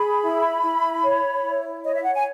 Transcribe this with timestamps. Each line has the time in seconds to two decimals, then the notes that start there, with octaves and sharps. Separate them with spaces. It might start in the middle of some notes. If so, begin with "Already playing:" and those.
Already playing: G#4 B5
0.22 E4
0.62 E4
1.02 C#5
1.43 E4
1.83 C#5 D#5
1.94 E5
2.03 F#5
2.13 G#5